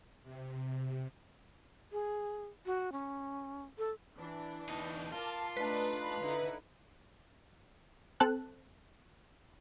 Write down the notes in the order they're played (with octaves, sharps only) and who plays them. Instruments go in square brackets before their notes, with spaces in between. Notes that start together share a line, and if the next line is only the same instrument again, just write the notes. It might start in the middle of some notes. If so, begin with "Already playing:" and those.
[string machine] C3
[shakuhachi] G#4
F#4
C#4
A4
[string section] E3 D4
[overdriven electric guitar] E2 D#4
[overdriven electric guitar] F4 [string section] A#4 A5 D6
[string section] A3 D4 D#4 [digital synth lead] B4
[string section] D3 D#4 E4
[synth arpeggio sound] C4 A4 A5 F#6